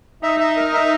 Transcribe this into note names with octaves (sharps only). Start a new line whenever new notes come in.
D#4 E5
E5
A#4
E5